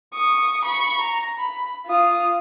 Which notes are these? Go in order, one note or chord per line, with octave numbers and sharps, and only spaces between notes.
C#6 D#6
B5 C#6
A#5
B5
F4 D#6